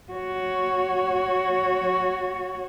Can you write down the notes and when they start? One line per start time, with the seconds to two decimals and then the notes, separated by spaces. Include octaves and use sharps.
0.12 F#4 C#5